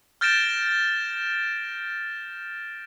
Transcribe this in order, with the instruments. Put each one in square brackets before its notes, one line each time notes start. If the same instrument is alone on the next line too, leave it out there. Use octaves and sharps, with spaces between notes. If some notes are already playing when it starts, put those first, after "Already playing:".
[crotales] F6 G6 A6 A#6 D7 E7